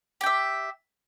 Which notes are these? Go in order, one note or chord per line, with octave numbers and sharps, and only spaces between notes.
G4 E5 G5